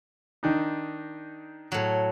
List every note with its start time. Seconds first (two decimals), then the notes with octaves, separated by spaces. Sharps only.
0.43 D#3 D4 D#4
1.72 A2 F#3